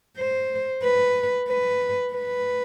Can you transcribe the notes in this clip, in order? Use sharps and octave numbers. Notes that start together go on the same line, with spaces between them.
C5
B4
B4
B4